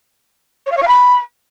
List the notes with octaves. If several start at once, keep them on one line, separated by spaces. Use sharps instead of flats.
C#5
F5
C#5
F5
B5